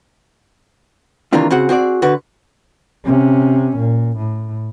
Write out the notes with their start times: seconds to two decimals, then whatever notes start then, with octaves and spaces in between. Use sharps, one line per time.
1.33 C3 D#3 E3 A#3 D4 F4
1.50 C#3 C4 F#4 F#5
1.69 C4 F#4 G#4 D5
2.02 D3 F#4 B4
3.04 C3 C#4
3.77 A#2
4.17 A2